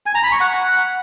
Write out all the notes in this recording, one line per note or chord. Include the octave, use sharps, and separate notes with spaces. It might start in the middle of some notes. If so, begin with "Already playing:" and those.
G#5
A#5
B5
C#6
F#5